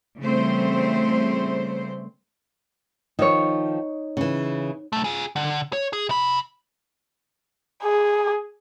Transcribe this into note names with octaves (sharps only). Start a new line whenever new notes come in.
C#3 E3 G3 A3 C4 C5
D#3 F3 D#4 C#5
C#3 E3
B1 A3
F4 G#4
D3
C#5
G#4
C3 B5
G#4